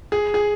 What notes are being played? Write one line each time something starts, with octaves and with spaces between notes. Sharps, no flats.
G#4
G#4